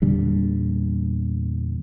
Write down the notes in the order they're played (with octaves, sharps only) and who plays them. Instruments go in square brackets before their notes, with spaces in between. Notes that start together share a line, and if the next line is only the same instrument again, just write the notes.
[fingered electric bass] E2 A#2 D3 G3